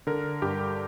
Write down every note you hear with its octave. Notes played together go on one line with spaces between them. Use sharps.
D3 A#4
G2 G4